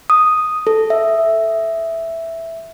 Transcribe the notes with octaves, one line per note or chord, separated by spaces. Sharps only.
D#6
A4
E5